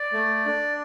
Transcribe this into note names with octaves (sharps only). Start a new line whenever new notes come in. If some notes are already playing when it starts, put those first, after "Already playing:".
Already playing: D5
A3
D4